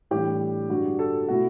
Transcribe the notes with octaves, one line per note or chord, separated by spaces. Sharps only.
A2 E3 G3 D4 G4
G2 D3 G3 F#4
A4
B2 A3 E4 F#4